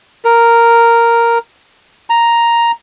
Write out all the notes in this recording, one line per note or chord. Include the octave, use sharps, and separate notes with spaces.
A#4
A#5